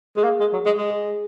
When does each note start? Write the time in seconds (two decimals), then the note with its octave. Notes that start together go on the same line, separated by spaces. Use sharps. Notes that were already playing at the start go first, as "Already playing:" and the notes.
0.17 G#3 G#4
0.24 A#3
0.40 G#3
0.53 F#3
0.66 G#3 G#4
0.78 G#3
0.90 G#4